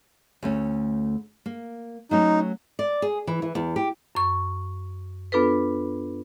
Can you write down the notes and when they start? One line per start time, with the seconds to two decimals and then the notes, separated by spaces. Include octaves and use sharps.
0.43 D2 A3 C#4
1.46 A#3
2.11 F#3 A3 C#4 D#4
2.79 D5
3.02 G#4
3.27 E3
3.42 E3
3.55 E2
3.76 G4
4.15 F#2 C#6
5.32 B3 D4 F4 A4 B4